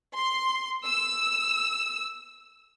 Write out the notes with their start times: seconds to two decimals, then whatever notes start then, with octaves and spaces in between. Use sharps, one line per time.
0.15 C6
0.85 E6